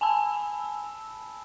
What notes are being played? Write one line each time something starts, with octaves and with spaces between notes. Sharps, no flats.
G#5 A5 B5 E6